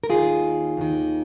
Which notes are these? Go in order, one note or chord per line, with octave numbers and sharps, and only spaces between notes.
A#4
D#2 D#3 F4 G#4
D#2 D#3